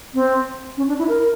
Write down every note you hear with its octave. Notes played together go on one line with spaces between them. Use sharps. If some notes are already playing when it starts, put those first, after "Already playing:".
C4
C#4
D4
E4
A#4